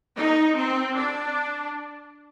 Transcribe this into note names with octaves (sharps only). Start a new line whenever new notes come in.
D#4
C4
D4